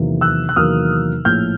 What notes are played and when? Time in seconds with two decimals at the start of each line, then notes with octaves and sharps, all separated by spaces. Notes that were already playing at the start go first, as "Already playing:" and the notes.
Already playing: E2 C3 D#3 F#3 A#3
0.21 E6 F#6
0.49 F#6
0.56 E2 C3 D#3 F#3 A#3 D#6 F6
1.25 A#1 A2 F3 F6 G6